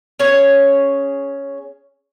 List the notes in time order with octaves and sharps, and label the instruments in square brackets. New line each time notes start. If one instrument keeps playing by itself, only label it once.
[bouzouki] C#4 G#4 C#5